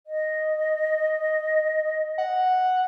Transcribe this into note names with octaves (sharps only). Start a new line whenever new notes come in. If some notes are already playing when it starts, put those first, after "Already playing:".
D#5
F#5